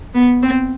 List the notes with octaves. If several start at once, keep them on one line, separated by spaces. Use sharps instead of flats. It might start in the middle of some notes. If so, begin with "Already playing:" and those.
B3
C4